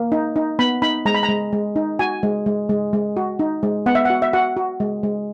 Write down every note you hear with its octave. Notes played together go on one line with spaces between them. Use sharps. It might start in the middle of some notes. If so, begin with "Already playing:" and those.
Already playing: A#3
D#4
D#4
B3 B5
D#4 B5
G#3 A#5
B5
A#5
G#3
G#3
D#4
F#4 G#5
G#3
G#3
G#3
G#3
F#4
D#4
G#3
B3 F#5
E5
F#4 F#5
E5
F#4 F#5
F#4
G#3
G#3